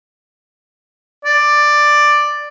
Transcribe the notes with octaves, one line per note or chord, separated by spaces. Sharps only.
D5